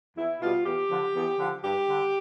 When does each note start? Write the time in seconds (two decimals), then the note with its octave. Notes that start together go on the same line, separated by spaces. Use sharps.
0.15 E2 E4
0.40 B2 G3 F4
0.64 E2 G4
0.89 D3 F3
1.13 E2
1.38 D3 F3
1.62 G2 G4
1.87 D3 G3